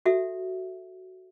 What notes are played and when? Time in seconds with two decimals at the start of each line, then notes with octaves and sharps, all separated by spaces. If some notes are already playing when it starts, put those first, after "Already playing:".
0.06 F#4 A4 E5